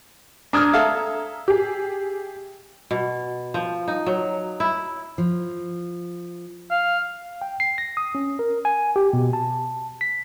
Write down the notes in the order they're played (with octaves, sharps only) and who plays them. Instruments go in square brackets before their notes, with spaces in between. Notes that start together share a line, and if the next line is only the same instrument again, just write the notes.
[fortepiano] D4 F6 [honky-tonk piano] A#5 D#6 G#6
[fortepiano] A4 E5 F5
[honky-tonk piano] G4 G#4
[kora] B2
F3
D#4
F#3
E4
[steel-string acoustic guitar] F3
[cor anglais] F5
[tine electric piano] G5
C7
A#6
D#6
C#4
A#4
G#5
G4
B2
A5
B6